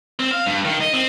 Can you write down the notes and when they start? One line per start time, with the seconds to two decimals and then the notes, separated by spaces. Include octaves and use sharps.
0.20 C4
0.31 F5
0.46 G2
0.65 D#3
0.81 D#5
0.93 C4